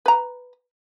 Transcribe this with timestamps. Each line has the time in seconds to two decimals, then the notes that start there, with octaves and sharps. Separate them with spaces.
0.06 B4 A#5